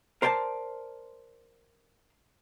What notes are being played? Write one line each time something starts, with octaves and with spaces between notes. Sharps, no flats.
A#4 C5 D5 G5 A5